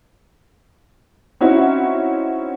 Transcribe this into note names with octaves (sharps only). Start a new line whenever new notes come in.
C4 C#4 D#4 E4 F#4